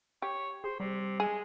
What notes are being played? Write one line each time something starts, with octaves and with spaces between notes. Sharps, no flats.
G4 C#5
G#4 C5
C3 G3
G#3 G#4